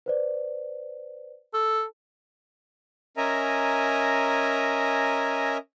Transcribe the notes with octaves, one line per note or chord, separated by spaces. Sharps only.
B4 C5 D5
A4
C#4 A#4 D#5 E5 G#5 A#5